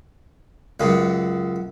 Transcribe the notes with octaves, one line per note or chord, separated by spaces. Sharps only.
C#2 F#2 C#3